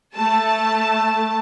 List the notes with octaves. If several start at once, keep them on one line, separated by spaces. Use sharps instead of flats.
A3 A5